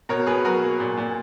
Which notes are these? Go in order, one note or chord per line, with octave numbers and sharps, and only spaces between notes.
B2 A#4 C#5
B2 G#4 B4
F#3 F#4 A#4
A#3
A#2
A#2